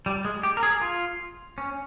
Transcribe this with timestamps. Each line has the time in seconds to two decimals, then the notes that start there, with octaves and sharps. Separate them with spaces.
0.06 G3
0.25 G#3
0.43 G4
0.57 A#4
0.63 G#4
0.81 F4
1.58 C#4